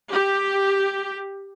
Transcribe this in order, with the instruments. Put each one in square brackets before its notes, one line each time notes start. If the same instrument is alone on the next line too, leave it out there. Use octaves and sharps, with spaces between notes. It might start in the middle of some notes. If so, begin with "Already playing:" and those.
[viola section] G4